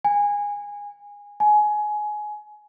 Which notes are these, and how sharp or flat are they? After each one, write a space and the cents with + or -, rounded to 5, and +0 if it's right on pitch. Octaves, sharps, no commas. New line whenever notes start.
G#5 -20
G#5 +20